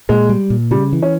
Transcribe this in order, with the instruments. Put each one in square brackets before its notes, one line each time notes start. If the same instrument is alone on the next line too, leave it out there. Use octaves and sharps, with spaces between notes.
[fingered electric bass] A#2 [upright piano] G#3
[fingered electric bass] G3
A#2
[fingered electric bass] C#3 [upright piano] G3
[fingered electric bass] E3
[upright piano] C#4